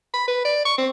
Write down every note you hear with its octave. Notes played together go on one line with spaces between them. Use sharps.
B5
B4
D5
C#6
C4